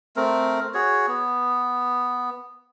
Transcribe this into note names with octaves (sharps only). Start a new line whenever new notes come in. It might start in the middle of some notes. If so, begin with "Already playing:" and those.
A3 C4 A#4
F#4 G#4 C#5
B3